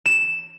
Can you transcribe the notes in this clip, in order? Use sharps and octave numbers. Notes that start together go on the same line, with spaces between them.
E7